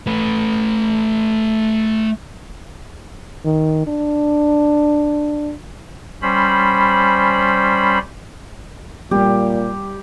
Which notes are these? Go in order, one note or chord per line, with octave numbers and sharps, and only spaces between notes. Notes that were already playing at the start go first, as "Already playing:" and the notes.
A3 B4
D#3
D4
G3 C#4 C5 B5
A#2 G3 G4